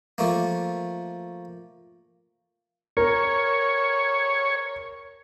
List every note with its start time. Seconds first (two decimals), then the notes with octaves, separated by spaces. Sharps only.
0.18 F3 A3 A#3
2.97 A#4 C#5